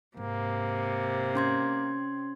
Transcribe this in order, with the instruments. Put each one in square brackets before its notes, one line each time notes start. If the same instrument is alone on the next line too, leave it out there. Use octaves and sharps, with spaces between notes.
[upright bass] G#2 [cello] C3 [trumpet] A#3
[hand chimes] C#4 C6 G#6